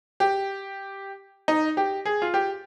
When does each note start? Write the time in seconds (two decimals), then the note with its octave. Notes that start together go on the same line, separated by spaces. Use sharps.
0.20 G4
1.48 D#4
1.77 G4
2.05 G#4
2.22 F4
2.34 G4